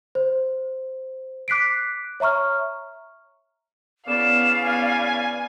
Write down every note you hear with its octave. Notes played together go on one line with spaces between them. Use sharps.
C5
D6 F#6 B6 C7 D7
C#5 E5 A#5 C#6 F6
C#3 B3 E4 D5 F5 E7
G#5